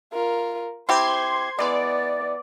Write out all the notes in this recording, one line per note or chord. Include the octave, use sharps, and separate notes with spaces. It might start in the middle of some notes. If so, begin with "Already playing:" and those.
F4 A#4
C4 E4 G4 C5 C6 G#6
E3 G#3 B3 D5